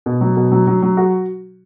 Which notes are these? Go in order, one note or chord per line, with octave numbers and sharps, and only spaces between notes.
B2
F#3
B2
F#3
F#3
F#3
F#4